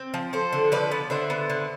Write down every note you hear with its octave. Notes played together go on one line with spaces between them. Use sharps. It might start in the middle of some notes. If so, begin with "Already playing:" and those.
Already playing: C4
F3
F3 A4 C5
D3
F3 B4 D5
B3
D3 C5 E5
B3
D3